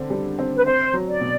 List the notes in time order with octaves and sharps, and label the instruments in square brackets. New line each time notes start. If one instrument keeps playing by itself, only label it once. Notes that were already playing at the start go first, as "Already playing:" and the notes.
Already playing: [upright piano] D3 C4
G3
C4
[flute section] B4
[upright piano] C4 [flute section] C5
[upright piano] F#3
[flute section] D5
[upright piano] B2